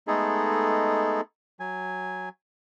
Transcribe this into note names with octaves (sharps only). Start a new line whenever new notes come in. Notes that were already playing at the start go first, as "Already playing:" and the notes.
G#3 A3 B3 D#4 G#4 A4
F#3 G#5